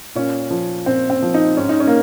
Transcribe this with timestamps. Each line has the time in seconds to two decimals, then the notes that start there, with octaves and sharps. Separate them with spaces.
0.15 A#2 C#4
0.51 F3
0.86 A#2 C4
1.10 C4
1.22 F3
1.34 D#4
1.57 G#2 C#4
1.69 D#4
1.80 C#4
1.87 A#3